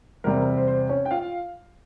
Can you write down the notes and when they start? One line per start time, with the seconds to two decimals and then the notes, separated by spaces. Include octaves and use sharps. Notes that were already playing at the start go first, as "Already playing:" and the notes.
0.24 E2 C3 G3 C4 A#4
0.36 A#4
0.57 C5
0.67 C5
0.89 C#4 C#5
1.05 G5
1.11 F4 F5